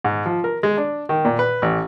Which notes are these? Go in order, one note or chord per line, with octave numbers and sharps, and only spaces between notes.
G#2
F3
A#4
G#3
D4
D#3
A#2
B4
A1